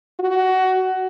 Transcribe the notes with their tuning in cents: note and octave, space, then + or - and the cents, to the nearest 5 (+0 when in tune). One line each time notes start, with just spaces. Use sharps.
F#4 +20